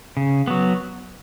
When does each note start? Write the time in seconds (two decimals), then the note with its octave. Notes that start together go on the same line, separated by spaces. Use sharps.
0.17 C#3
0.48 F#3 B3